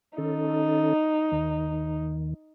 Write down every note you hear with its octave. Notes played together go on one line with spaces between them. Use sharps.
D#3 C#4 D#4 A4
D#2 D#3